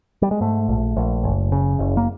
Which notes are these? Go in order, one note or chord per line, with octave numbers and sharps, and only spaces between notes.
G3
G#3
G#2 A3
A#1
A#1
F#1
C#3
F#1
A#3